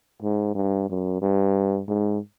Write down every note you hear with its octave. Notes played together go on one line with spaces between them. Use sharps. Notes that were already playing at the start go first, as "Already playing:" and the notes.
G#2
G2
F#2
G2
G#2